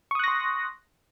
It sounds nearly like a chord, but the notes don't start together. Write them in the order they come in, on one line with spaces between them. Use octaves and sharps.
C#6 D#6 F#6 A#6 C6